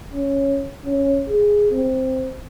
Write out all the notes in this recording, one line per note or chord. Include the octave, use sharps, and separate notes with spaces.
C#4
C#4
G#4
C4